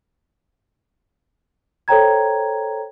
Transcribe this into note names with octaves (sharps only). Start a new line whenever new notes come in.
A4 C5 C#5 G5 A#5 G#6